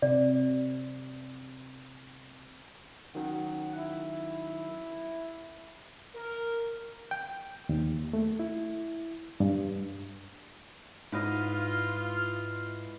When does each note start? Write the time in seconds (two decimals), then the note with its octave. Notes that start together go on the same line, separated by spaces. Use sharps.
0.02 C3 D5
3.15 D#3 F#3 C#4 F#5
3.76 E4
6.15 A#4
7.11 G5
7.69 D#2
8.13 A3
8.39 E4
9.40 G2
11.12 G#2 E4 F4 B4 D#5